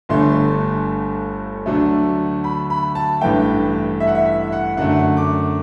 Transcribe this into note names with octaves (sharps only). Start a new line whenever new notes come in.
G1 G2 D3 A3 C6
D2 D3 F#3 A3
B5
B5
A5
A1 G2 E3 A3 G5
E5
F#5
E5
E5
F#5
F#2 D3 A3 F#5
D6